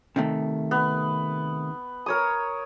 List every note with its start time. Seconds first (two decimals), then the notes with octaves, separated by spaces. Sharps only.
0.16 C3 D#3 A3
0.71 B3
2.06 A#4 C#5 D#6